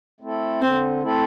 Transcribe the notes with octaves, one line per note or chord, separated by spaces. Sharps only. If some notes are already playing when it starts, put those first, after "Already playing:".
A3 C4 E4 A4
D3 C4
A3 C4 E4 A4